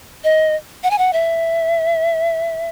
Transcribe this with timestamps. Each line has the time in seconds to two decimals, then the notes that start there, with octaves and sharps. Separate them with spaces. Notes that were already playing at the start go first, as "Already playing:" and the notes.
0.24 D#5
0.83 F#5
0.91 G#5
0.98 F#5
1.13 E5